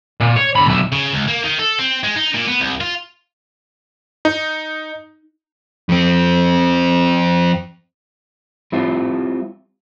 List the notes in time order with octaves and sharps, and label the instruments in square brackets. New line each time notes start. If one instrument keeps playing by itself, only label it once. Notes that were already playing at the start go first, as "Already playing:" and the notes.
[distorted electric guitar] A#2
C#5
D3 B5
B1 E5
C#3
C#2
A#3
D#3
A4
C4
G#3
D#4
A#2
B3
C2
F4
[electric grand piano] D#4
[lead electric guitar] F2 C4
[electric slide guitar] G3 C4 E4 F4